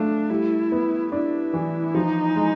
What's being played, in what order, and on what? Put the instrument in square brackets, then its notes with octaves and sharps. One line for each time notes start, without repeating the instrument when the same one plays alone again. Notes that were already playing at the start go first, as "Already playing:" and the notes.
Already playing: [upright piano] A3 F4 [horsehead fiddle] D4
[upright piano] G3 [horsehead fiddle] E4
[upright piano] B3
[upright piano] D4 [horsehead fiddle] E4
[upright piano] E3
[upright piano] F3 [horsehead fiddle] D#4
[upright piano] G#3